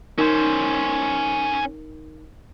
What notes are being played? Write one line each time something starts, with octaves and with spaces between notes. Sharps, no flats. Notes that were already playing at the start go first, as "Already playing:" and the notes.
C#4 D#4 A#4 C5